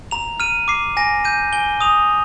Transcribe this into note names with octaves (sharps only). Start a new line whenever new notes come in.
A#5 F7
F6 D#7
D6 C7
G#5 A#6
G6 D#7
G#5 G7
D#6 F7